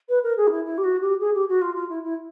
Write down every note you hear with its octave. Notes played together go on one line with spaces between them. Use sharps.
B4
A#4
G#4
D#4
E4
E4
G4
F#4
G4
G#4
G4
F#4
F4
F4
E4
E4